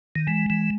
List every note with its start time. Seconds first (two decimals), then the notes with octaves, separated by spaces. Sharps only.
0.16 D#3
0.27 E3 G#3
0.50 E3
0.61 G#3